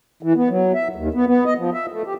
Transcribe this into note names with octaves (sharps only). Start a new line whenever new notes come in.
E3
B3
F#3
E5
D#2
B3
B3
D#5
F3
E5
A3
G4